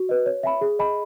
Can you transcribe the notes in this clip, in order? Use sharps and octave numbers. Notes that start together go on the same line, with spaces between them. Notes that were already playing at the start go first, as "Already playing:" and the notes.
Already playing: F#4
B4 D#5
C#5
E5 G#5 B5
G#4
D#5 G#5 B5